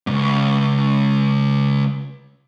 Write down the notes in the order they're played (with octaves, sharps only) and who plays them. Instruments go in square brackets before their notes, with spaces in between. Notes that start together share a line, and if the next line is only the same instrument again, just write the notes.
[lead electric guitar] C#2 G#2